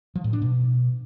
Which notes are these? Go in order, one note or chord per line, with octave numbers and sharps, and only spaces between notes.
F3
A2
D4
B2